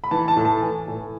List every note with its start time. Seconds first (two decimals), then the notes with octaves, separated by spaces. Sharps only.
0.04 B5
0.11 E3 A5
0.28 A5
0.36 A2
0.45 A5
0.62 E3 G#5
0.88 A2